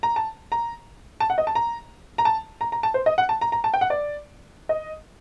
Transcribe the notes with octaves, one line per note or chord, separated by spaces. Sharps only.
A#5
A5
A#5
A5
F#5
D#5
A5
A#5
A#5
A5
A#5
A#5
A5
C5
D#5
F#5
A5
A#5
A#5
A5
G5
F#5
D5
D#5